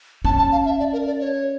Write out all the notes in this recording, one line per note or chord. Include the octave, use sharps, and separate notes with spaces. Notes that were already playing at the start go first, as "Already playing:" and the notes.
C#4 A5
A5
F5
E5
D5
A#4
D5
C#5